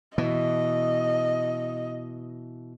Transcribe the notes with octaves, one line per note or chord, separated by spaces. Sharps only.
B2 E3 D#5